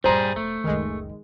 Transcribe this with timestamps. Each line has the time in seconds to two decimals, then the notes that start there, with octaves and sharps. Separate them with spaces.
0.04 D#1 G2 G3 G#4 C5 A#5
0.36 E1 A3
0.64 F#1 C#2 D#3 G#3